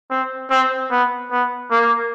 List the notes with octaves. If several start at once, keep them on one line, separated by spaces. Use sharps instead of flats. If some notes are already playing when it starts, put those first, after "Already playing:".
C4
C4
B3
B3
A#3